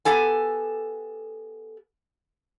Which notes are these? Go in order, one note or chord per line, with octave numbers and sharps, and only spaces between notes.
B3 G4 A4 G#5